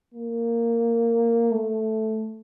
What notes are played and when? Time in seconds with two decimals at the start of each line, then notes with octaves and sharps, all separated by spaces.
0.14 A#3
1.52 A3